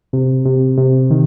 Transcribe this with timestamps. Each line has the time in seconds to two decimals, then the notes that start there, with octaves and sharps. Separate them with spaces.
0.13 C3
0.45 C3
0.78 C3
1.10 D#3